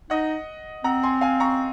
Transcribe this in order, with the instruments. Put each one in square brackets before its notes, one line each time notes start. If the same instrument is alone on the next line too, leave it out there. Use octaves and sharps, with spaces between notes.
[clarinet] D#4 [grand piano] D#5 F#5
[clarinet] C4 [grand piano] F#5 A#5
[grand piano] G#5 C6
F5 G#5
A#5 C#6